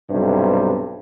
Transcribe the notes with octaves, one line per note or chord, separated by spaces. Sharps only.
B1 G2 C3